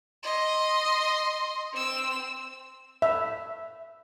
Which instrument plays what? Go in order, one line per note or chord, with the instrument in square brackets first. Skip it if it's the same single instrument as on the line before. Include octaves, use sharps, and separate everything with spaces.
[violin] D#5 C6
C4 E6
[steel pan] E5